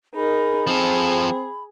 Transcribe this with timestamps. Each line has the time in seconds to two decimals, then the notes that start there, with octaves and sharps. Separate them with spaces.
0.15 D#4 G#4 A#4 B5
0.67 F3 C4 G#4 A4